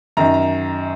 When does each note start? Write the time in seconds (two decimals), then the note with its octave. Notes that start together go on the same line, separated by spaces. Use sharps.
0.17 F#2 D#3 A#5
0.34 A#5